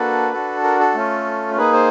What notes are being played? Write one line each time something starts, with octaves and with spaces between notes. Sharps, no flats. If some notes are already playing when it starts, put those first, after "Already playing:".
Already playing: A#3 D4 F#4 A4 B4
D4 F#4 A4
A#4
A4
A3 C#4 F4
A#3 D#4 G#4 B4
C5